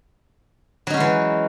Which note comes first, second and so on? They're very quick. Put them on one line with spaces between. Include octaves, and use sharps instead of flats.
F#3 D#4 C#4 G#3 E3